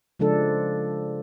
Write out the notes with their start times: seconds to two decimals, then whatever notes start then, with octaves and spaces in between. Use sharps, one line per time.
0.19 C#3 F3 G#3 D4 A4